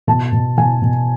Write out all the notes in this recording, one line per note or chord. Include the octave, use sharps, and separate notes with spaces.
B2 A5
B2
B2 G#5
B2